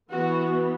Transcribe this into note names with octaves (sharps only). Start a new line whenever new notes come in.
E3 B3 F#4